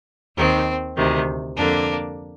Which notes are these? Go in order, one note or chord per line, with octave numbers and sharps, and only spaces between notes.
D#2 D#3 C4
D2 C3 D#3
F2 D3 A#3 D4